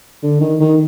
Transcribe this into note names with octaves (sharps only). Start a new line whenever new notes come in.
D3
D#3
D#3